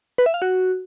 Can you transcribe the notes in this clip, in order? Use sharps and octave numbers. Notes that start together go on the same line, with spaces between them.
B4
E5
F5
F#4